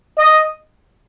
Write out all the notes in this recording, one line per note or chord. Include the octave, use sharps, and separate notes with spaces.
D#5